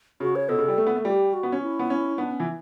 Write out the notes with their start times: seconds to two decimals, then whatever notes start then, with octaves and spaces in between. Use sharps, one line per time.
0.20 C#3 F#4
0.36 C#5
0.49 B2 A4
0.58 C#3
0.68 G3
0.78 A3
0.87 B3
0.96 A3
1.05 G3 G4
1.33 F#4
1.43 B3
1.52 C#4
1.62 E4
1.79 B3
1.90 C#4
2.18 B3 D4
2.32 C#4
2.40 E3